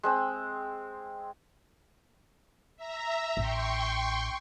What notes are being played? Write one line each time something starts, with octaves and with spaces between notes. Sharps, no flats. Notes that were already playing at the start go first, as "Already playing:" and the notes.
G#3 C4 E6
E5 A#5
A1 G5 C6 C#6